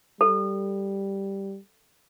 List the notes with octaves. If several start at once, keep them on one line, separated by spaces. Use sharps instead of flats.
G3 A4